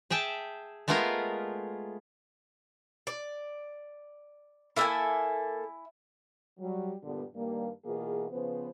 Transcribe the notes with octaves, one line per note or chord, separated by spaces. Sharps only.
G#4 E5 G5 A5
G#3 A3 B3 F4 G#4 A#4
D5
A#3 E4 A4 E5 G#5
F#3 G3
G2 A#2 D3 G3 B3 A4
G2 D#3 G3 A#3
B2 E3 A#3 F4 G#4
C#3 F3 B3 B4 C5